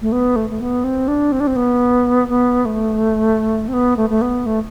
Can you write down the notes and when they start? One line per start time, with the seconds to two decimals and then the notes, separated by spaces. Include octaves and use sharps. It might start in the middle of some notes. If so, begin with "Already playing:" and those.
0.02 A3
0.12 B3
0.36 A3
0.50 A3
0.61 B3
0.84 C4
1.08 D4
1.32 C4
1.40 D4
1.47 C4
1.56 B3
2.29 B3
2.65 A3
3.68 C4
3.73 B3
3.97 A3
4.10 A3
4.22 B3
4.46 A3